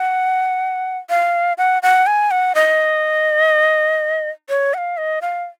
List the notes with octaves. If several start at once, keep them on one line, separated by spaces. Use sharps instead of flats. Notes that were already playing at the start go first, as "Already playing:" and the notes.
Already playing: F#5
F5
F#5
F#5
G#5
F#5
D#5
C#5
F#5
F5
D#5
F5